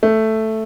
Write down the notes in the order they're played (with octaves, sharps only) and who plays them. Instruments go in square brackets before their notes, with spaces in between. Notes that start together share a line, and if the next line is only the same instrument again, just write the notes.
[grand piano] A3